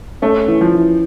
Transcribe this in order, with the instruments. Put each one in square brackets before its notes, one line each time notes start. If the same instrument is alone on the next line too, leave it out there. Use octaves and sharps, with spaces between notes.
[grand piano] A3 [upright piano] C#4
[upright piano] E3
[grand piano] F3
[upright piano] E3